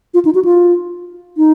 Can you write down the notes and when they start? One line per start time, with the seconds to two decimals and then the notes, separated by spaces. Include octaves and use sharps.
0.14 F4
0.25 D#4
0.35 F#4
0.45 F4
1.37 D#4